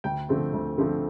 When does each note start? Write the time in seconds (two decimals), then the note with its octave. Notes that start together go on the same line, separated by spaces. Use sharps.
0.04 D2 G5
0.29 D3 F3 A3 C4
0.53 D2
0.78 D3 F3 A3 C4